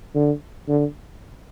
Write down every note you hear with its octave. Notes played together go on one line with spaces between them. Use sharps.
D3
D3